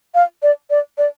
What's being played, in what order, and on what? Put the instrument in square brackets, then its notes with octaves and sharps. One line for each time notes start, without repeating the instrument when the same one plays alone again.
[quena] F5
D5
D5
D5